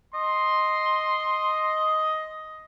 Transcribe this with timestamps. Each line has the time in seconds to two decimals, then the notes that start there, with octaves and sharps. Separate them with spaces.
0.14 D#5 C6